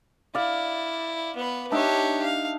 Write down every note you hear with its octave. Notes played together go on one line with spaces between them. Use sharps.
E4 D5 F5
B3 B4
D4 D#4 G4 C#5 E5
F5